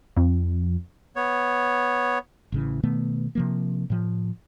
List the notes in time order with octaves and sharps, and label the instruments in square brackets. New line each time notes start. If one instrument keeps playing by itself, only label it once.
[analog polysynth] F2
[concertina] B3 C#5
[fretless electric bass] A1 C#3 E3
B2 D#3 A3 B3
C3 F3 A#3
A2 F3